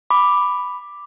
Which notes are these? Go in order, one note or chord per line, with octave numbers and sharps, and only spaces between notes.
B5 D6